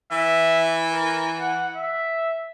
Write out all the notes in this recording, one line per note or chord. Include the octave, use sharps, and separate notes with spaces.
E3 E5
A#4
F#5
E5